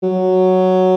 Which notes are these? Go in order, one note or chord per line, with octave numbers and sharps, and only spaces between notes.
F#3